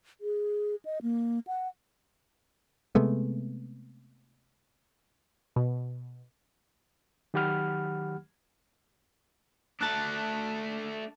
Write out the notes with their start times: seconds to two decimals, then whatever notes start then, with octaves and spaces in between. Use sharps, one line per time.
0.21 G#4
0.85 D#5
1.02 A#3
1.47 F#5
2.95 C3 G#3 A3 B3
5.56 B2
7.34 D#3 F#3 G4 F#5 B5 F6
9.81 A3 D4 A5 F#6